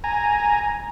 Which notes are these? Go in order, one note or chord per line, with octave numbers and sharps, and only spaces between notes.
G#5 A#5